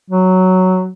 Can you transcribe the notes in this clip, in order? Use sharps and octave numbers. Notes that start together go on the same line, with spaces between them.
F#3